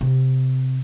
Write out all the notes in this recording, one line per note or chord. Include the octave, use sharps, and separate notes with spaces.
C3